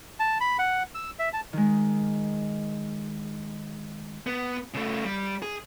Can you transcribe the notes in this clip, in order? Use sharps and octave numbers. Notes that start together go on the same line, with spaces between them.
A5
B5
F#5
E6
E5
A5
D#3 G#3
B3
C#3 A3
G3
G#4